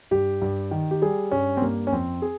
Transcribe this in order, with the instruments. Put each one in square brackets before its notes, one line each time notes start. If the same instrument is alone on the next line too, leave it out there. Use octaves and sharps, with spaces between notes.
[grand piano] G2 G4
G2
D#3
G4
G3 G#4
G2 C#4
C4
G2 A#3
C#4
F2 C4
G#4